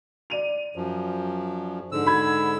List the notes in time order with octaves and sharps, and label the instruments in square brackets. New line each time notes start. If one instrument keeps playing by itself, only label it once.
[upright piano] D5 D#7 F7
[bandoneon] F#2 F3
G#2 D3 E6
[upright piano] B5 G#6